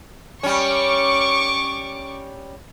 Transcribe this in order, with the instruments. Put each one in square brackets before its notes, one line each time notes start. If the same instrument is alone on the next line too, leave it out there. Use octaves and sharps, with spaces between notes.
[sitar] G3 C#4 [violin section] C#6 D6